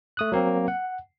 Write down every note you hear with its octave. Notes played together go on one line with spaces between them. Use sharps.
A3 D#6 F#6
F#3 A#3 C4
F#5